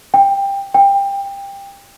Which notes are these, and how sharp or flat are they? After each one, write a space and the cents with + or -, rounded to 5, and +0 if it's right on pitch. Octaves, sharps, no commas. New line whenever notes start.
G5 +15
G5 +20